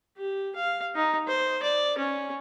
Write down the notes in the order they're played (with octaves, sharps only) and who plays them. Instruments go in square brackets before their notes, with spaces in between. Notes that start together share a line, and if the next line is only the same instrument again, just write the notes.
[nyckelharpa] G4
F5
D#4
C5
D5
C#4